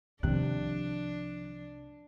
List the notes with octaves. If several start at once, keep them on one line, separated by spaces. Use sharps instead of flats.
C2 C3 D#3 F3 D4 F#6